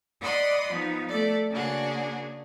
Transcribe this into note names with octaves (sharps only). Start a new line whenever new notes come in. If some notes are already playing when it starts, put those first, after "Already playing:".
D5 D#5 F#5 B5 C6 D#6
F3 B3 D#4
A3 A4 D5
C#3 A#3 D4 F#4 G#4